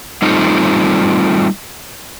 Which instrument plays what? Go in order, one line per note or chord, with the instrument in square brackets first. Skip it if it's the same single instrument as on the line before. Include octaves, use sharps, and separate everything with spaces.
[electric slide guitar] G3 A3 C4 D#4 F4